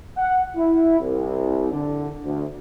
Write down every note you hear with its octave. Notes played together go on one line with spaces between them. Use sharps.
F#5
E4
C2
D3
D2